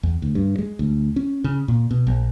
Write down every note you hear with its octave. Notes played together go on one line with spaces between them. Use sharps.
E2
D2
G2
G#3
D2
C#4
C#3
A#2
B2
A#1